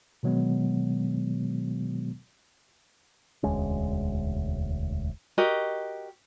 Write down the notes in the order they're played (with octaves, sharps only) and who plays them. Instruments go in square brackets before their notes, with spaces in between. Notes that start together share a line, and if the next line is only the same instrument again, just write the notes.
[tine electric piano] B2 D#3 F#3 G#3 B3
[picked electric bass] E1 D2 G#3 C#4
[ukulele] F#4 G4 A#4 D#5